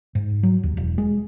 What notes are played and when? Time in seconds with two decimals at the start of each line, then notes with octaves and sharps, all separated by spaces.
0.15 G#2
0.43 F#3
0.63 D#2
0.77 E1
0.98 G#3